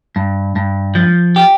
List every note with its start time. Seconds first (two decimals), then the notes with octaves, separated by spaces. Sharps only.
0.16 G2
0.56 G2
0.95 F3
1.36 G4